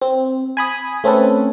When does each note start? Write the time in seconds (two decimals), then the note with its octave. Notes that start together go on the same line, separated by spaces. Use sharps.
0.02 C4
0.57 G#5 B5 D#6
1.04 A3 C4 C#4 A4 B4